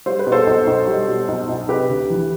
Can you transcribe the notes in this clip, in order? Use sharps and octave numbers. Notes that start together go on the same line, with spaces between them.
G3 C5
B4
B2
A4 C5
B1
B1
G3
B2
B1
B1
C3 G4 B4
D2
E3